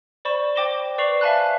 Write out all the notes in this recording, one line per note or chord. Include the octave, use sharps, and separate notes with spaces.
C5 D5 B5 C#6 E7
C5 G5 D6 A#6 E7 G7
B4 D5 C#6 C7 F7 F#7
E5 F5 G#5 A5 B5 F#6